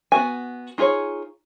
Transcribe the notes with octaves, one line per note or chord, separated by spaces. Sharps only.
B3 F#4 G#5
D#4 F4 G#4 C5 C#5